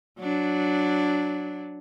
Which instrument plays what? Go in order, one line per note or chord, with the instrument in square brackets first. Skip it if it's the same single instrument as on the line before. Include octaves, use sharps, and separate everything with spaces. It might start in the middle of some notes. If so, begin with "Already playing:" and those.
[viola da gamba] F#3 D4